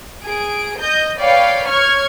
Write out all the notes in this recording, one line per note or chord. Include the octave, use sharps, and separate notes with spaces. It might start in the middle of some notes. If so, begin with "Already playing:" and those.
G#4 D7
D#5 G6
B4 C#5 D5 F5 G5
C#5 C#6 F6 G#6